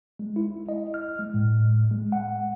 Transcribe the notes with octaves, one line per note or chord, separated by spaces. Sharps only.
G#3
E4
D#5
F6
G#3
A2
G#3
F#5